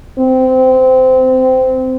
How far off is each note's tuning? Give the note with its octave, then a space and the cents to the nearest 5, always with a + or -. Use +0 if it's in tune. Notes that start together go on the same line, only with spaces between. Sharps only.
C4 -20